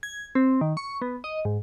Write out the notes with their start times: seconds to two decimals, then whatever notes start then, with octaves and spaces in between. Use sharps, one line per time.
0.03 G#6
0.35 C4
0.61 D#3
0.77 C#6
1.02 B3
1.24 D#5
1.45 G#2